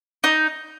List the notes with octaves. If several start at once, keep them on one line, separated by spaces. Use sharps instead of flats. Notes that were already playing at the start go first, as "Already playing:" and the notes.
D#4